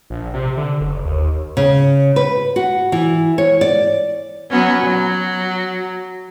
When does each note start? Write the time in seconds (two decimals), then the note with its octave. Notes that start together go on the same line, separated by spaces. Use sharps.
0.10 A#1
0.34 C3
0.57 D3
0.81 F#1
1.05 D#2
1.57 C#3
2.16 B4
2.56 F#4
2.92 E3
3.38 C#5
3.61 D5
4.50 F#3 B3 C#4
4.83 F#3